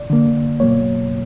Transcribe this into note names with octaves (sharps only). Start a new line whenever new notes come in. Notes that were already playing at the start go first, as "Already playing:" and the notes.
Already playing: D5
D3 A#3
B2 F#3 A#3 C#5